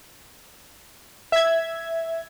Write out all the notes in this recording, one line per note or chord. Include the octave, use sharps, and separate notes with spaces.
E5 G#6